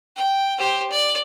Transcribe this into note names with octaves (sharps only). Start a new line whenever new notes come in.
G5
G4 C5
D5